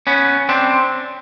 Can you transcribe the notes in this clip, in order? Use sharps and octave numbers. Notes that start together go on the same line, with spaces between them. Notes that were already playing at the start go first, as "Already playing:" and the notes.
B3 C#4
C4 D4